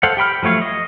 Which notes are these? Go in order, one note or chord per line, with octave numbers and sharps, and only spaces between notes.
A4 C5 F5 F#5
G4 G5 B5 F6
F3 F#3 A3 C#5 F5
D#5